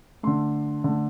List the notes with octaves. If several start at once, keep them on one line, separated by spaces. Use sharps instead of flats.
D3 A3 C6
D3 A3